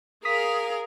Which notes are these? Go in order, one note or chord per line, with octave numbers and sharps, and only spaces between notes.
G#4 A#4 F5 D#6 B6